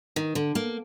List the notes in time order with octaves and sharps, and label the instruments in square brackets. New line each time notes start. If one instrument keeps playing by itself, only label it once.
[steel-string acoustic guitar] D#3
D3
A#3